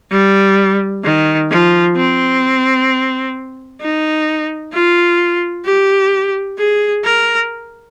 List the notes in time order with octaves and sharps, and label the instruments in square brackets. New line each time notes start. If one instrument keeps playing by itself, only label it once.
[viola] G3
D#3
F3
C4
D#4
F4
G4
G#4
A#4